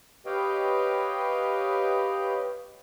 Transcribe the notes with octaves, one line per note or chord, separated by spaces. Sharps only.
G4 B4 C#5 D#5 F5 G5